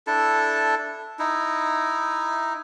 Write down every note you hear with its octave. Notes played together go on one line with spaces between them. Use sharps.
D4 E4 A4 A5
D#4 E4